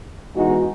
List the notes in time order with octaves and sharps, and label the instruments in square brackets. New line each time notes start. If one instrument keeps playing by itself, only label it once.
[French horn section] E2 B2 G#3 D#4 F#4